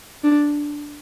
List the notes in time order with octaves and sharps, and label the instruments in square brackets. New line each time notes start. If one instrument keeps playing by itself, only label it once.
[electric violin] D4